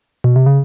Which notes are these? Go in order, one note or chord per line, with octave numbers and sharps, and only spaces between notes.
B2
C3
C#3